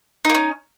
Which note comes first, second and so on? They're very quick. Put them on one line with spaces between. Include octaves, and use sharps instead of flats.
D#4 A#3 C#4